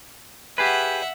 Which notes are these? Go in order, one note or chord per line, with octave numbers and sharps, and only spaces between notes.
G4 G#4 B4 E5 F#5